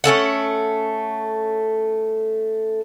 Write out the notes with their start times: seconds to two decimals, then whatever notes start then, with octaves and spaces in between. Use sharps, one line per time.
0.04 A3 C#4 A4 F#5